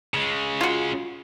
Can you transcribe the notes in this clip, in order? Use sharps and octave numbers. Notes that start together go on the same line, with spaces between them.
C#3 G#3
F4 F#4